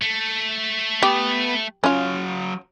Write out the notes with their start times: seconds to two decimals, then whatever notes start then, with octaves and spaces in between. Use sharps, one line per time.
0.02 A3
1.03 B3 G4
1.84 F#3 C#4 F4 F5